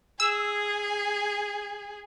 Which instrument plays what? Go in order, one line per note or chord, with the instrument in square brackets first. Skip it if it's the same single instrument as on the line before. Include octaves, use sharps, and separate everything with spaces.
[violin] G#4 [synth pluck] E6